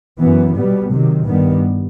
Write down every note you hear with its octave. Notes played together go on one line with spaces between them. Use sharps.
F#2 E3 B3
B2 G3 B3
C3 D#3 F#3
G2 D#3 G3 B3